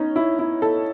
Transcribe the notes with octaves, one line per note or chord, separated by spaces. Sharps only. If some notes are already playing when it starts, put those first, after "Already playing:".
Already playing: B3 C#4 D#4
E4
E4
A4